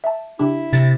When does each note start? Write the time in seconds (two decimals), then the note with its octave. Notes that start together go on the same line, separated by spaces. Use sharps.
0.04 E5 A5
0.39 C#3 D4 E4 G4
0.73 C3 A6